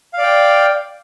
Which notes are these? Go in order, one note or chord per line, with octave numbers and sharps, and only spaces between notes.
D5 F5 G5